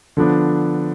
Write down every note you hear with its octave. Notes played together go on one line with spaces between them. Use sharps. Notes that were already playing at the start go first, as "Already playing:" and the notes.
D3 F3 B3 D4